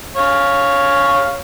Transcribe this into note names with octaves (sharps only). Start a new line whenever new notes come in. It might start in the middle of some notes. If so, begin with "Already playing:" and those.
C#5 F5